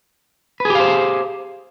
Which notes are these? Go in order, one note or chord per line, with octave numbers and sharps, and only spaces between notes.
G4 G#4 B4 C5 F5